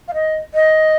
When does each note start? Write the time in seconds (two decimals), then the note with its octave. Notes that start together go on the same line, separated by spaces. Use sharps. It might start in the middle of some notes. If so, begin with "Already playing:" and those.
0.08 F5
0.14 D#5
0.54 D#5